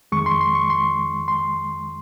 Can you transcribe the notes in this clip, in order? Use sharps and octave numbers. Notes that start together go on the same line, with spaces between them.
F2 D#3 G#3 C#6
C6
C6
C#6
C6
C6